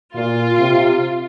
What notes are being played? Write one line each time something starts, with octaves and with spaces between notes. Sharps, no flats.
A#2 F4
C3